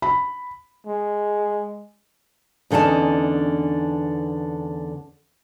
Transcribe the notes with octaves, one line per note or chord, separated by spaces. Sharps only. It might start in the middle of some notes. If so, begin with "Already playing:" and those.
B5
G#3
E2 D3 C#4 D#4 A5